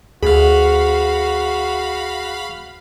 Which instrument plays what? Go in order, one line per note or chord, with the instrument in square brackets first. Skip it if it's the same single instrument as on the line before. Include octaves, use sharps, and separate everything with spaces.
[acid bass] D2 [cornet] F#4 [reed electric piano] G#4 [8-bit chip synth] F5 B5